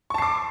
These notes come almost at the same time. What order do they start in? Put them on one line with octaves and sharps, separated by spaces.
C#6 A5 C7 D6